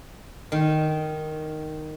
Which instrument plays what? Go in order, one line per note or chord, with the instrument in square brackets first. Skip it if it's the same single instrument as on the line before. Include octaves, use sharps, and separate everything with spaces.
[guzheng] D#3